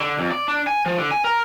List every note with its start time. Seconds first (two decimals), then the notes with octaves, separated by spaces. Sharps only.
0.01 D3
0.19 F2
0.31 D5
0.48 D4
0.67 G#5
0.86 F3
0.98 D3
1.11 G#5
1.24 A#4